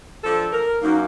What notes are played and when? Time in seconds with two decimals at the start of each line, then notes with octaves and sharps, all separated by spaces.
0.24 F3 D4 A4
0.52 A#4
0.82 F#2 A#3 D#4